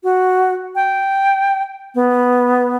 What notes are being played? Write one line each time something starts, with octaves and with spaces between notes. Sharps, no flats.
F#4
G5
B3